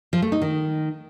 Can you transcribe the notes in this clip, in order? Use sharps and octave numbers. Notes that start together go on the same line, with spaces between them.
F3
A3
D#4
D#3